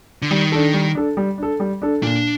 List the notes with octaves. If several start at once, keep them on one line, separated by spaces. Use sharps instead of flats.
D3
D#3 G3
D4 A4
G3
D4 A4
G3
D4 A4
G3
D4 A4
A#2 D4